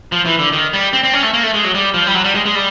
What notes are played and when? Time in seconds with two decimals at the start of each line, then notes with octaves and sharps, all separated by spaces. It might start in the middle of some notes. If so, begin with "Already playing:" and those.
0.12 F3
0.25 E3
0.39 D3
0.52 D#3
0.73 G3
0.93 C4
1.04 C4
1.13 C#4
1.23 A3
1.34 A#3
1.43 A3
1.54 G#3
1.64 F#3
1.75 G3
1.94 F3
2.07 G3
2.15 F#3
2.24 G3
2.35 G#3
2.46 G#3
2.55 G3